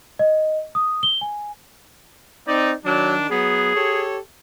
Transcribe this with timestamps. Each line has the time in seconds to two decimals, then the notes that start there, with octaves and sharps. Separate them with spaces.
0.19 D#5
0.75 D#6
1.03 G7
1.21 G#5
2.48 C4 D#4 D5
2.86 D#3 F#3 D4
3.30 F#3 B3 G#4
3.75 G4 A4 C#5